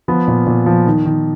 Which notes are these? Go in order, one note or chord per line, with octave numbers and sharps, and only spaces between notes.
F3 B3
A#2
A#2
F3
D#3
D#3